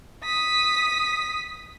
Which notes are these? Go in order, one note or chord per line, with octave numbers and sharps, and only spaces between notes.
D#6 B6